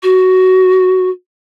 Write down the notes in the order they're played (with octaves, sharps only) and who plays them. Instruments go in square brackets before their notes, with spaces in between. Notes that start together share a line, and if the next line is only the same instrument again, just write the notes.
[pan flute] F#4